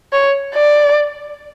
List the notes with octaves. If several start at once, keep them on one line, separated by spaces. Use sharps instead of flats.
C#5
D5